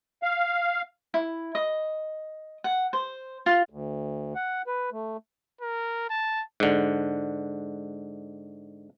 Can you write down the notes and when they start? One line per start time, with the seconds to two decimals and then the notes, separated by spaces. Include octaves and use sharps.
0.23 F5
1.14 E4
1.55 D#5
2.64 F#5
2.93 C5
3.46 F4
3.70 D2
4.35 F#5
4.67 B4
4.92 A3
5.61 A#4
6.09 A5
6.60 G#2 D3